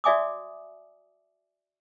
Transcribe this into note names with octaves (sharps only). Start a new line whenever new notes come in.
F#4 D5 E5 G#5 D6 D#6